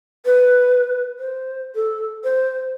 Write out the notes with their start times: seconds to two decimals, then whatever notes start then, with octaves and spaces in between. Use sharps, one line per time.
0.25 B4
1.19 C5
1.75 A4
2.24 C5